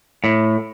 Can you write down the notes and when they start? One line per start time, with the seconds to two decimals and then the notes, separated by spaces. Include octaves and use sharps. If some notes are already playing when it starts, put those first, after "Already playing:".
0.24 A2